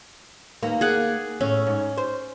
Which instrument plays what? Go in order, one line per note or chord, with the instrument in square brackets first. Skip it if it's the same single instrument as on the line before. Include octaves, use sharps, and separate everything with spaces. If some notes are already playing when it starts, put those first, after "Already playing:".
[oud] D#2 A#3 B3
[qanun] G#4 D5 F#5
[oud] A2 [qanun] C#4
[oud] G#2
C5